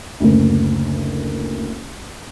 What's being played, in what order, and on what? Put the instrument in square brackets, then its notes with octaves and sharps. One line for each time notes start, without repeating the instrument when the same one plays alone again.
[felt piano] F#1 D2